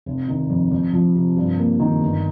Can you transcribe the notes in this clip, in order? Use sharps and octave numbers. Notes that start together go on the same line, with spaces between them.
F1
D#3
F2
F2
F3
C3
G2
A#3
D#3
G1